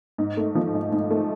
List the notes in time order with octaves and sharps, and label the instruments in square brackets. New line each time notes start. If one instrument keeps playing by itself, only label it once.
[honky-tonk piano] G#2
A3
F3
G#2
G#2
A3